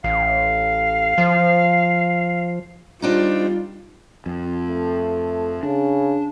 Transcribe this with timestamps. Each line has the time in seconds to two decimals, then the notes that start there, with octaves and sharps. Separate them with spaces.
0.04 A1 F5
1.18 F3
3.02 G3 C4 D4 D#4 F4
4.26 F2
4.67 A3
5.63 C#3 D4